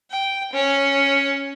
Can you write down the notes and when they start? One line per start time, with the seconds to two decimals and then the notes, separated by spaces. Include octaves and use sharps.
0.10 G5
0.53 C#4